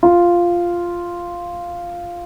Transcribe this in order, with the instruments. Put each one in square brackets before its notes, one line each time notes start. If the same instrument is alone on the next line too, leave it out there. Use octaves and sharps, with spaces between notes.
[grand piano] F4